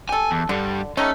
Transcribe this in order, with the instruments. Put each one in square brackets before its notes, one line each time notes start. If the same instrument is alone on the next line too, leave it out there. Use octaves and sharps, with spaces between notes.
[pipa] G4 A4 [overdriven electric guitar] G#5
[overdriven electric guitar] E2
[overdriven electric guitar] G2 G3 [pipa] D3
[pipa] A3 D#4 G4 [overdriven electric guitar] C#4